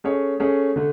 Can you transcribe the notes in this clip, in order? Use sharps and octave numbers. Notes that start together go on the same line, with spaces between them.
A3 C#4 G#4 C#5
A3 C#4 G#4 C#5
D3 A3